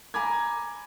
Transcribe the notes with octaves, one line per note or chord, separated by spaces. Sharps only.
G#5 A#5 B5 D6 G#6